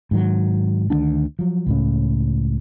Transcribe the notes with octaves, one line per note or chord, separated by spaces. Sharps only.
G#2 D#3 F#3
D2 D#3 A#3 D4
F3 F#3
C#2 A2 C#3